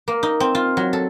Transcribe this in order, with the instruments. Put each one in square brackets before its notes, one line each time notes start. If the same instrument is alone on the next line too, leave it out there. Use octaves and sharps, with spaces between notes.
[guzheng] A#3
D#4
C4
F4
F#3
A4